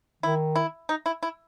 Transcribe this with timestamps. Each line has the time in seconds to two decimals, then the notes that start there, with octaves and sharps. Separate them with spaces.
0.23 D#3 E4
0.55 E4
0.89 D#4
1.06 E4
1.23 E4